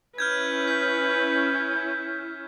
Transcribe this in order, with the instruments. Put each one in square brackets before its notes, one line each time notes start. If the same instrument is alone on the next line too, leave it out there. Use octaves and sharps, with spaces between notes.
[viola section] C#4 E4 [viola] B4 [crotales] F6 G6 G#6
[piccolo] G6 [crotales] B6